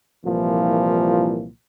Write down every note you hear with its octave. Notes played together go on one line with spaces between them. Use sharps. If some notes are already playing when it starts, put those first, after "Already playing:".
C2 A#2 E3 F3